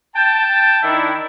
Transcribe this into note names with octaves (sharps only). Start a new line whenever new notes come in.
G5 A5
D#3 D4 E4